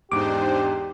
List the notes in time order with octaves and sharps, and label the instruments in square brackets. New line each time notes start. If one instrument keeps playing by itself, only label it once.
[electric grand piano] E2 G#2 [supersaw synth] D4 D#4 C5 [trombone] G4 [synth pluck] D6